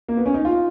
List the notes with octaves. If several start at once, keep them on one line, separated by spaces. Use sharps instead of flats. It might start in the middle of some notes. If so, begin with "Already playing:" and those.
A#3
B3
C#4
D#4
F4